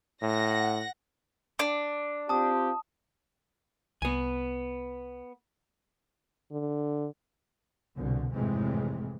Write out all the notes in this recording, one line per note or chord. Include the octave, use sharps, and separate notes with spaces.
A2 F#5 A#6
D4
C4 F4 G4 A5 D#6
C2 B3 G#5
D3
C2 B2 D3
G#1 F2 A2 C3 E3 G#3